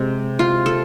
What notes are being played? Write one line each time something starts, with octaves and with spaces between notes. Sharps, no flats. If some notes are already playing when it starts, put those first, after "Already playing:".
Already playing: C3 G#3
F4
A4